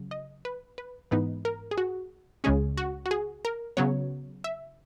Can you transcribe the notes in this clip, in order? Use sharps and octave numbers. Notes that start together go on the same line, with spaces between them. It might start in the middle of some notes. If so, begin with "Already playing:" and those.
Already playing: C#3 F#3
D#5
B4
B4
G#2 E3 B3 D#4 B4
A#4
G#4
F#4
C#2 C#3 G#3 C#4 G#4
F#4
F#4
G#4
A#4
C#3 F#3 B3 C#5
E5